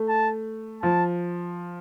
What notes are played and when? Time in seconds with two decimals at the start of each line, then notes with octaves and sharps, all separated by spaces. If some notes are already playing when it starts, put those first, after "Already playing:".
Already playing: A3
0.08 A5
0.82 F3 A5